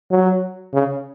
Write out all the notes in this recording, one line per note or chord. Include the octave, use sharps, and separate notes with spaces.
F#3
C#3